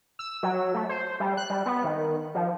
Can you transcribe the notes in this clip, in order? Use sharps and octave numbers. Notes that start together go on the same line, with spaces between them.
E6
F#3
A3
C5
G3
F#6
G3
B3
D#3
F3